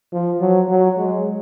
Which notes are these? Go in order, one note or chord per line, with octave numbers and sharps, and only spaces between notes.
F3
F#3
F#3
G#3